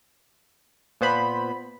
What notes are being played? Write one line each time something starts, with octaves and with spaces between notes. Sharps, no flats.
A#2 B3 C5 B5